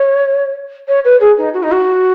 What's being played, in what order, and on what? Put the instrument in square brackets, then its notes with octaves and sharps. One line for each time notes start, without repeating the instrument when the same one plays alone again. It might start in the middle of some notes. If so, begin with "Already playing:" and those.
Already playing: [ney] C#5
C#5
B4
G#4
D#4
F#4
D#4
F#4